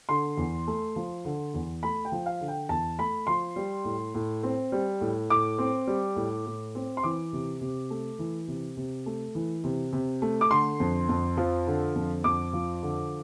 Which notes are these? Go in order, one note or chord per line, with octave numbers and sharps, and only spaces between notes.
D3 C6
E2
A3
F3
D3
E2
A3 B5
G5
F3
F5
D3
G5
E2 A5
A3 B5
F3 C6
G3
A2
A2
C4
G3
A2
A2 D6
C4
G3
A2
A2
C4
C6
E3 D6
C3
C3
A3
E3
C3
C3
A3
E3
C3
C3
A3
D6
D3 C6
F2
F2
F3
D3
F2
F2 D6
F3
D3